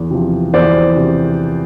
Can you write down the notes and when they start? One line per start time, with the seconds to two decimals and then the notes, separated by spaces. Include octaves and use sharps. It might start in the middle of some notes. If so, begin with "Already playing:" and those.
Already playing: E2
0.11 C3 F3
0.54 E2 C5 D5
0.96 C3